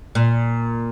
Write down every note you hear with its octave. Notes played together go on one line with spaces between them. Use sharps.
A#2